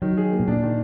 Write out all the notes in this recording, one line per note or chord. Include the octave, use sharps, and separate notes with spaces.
D#3 F#3
G#4
A#3
B2
A#2 D4
D#3